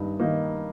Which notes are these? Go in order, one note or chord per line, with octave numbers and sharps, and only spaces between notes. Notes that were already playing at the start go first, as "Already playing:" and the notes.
Already playing: G2 D#3 D#4
D#3 A#3 D#4